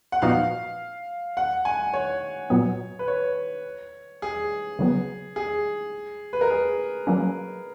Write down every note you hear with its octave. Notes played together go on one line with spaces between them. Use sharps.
F#5
A#2 F3 B3 D#4 F#4 F5
F#5
G#5
C#5
A#2 F#3 B3
B4
C#5
G#4
C#3 F#3 B3
G#4
B4
A#4
G#4
F#3 A#3 C#4